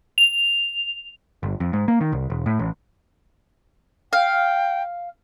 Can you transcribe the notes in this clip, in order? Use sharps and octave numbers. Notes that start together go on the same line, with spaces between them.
F7
G1
F2
G#2
A#3
D#3
C2
E1
A2
A1
F5 G5